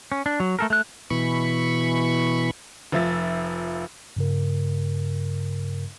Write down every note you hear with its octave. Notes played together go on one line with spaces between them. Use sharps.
C#4
D4
F#3
A3 A4 A#4
A3 F#6
B2 E3 B5 C#6
F1 F3 E5 A6
G2 C#3 A#4